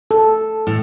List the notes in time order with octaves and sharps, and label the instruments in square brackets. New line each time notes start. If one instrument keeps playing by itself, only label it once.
[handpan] A4
[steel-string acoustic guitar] A2